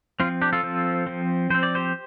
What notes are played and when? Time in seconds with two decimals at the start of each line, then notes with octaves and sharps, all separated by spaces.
0.20 F3 C4 F4
0.42 D4 G4
0.53 F4 A4
0.63 F3 C4
1.07 F3 C4
1.50 F3 C4 C5
1.63 D5
1.75 G4 C5